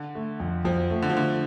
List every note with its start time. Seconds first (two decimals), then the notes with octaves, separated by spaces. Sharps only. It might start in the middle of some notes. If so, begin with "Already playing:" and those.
Already playing: D3
0.15 A3
0.40 F2
0.65 F2 F3
0.90 A3
1.02 D3
1.09 F3
1.15 D3 A3